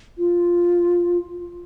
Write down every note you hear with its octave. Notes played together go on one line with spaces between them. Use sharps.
F4